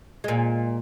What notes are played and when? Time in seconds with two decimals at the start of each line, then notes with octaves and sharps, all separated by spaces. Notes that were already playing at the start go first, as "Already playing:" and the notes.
0.24 A#2 G#3